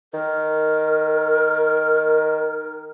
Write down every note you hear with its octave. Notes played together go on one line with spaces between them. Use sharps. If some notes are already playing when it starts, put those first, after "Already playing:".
D#3 A#4